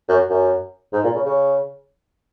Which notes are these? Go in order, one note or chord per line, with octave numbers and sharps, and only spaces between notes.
F#2
F#2
G#2
A#2
C#3
C#3